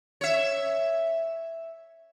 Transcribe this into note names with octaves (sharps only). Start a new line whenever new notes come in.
C#5 E5